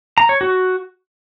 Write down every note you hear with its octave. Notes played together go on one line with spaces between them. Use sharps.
A#5
C#5
F#4